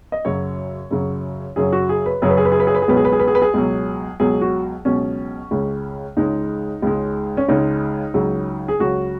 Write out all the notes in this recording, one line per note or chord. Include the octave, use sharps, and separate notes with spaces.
D#5
F#2 C#3 F#3 C#5
F#2 C#3 F#3
F#2 C#3 F#3 G#4
F#4
G#4
B4
F#2 C#3 F#3 G#4
B4
G#4
B4
G#4
B4
G#4
B4
G#4
C#2 B2 F#3 B4
G#4
B4
G#4
B4
G#4
B4
G#4
C#2 B2 F#3
C#2 B2 F#3 G#4
F#4
C#2 B2 F#3 C#4
C#2 C#3 G#3
C#2 C#3 G#3 D#4
C#2 C#3 G#3
C#4
C#2 C#3 G#3 D#4
C#2 C#3 F#3
G#4
C#2 C#3 F#3 F#4